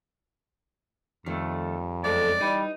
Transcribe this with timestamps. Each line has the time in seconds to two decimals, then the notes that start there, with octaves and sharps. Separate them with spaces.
1.26 F2 D#3 F3 G3 A3
2.04 F#2 G#3 A3 C4 A4 D5
2.41 E3 G3 D#4